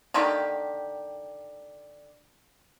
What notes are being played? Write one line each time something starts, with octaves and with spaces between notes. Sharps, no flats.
D3 D#3 A#3 G4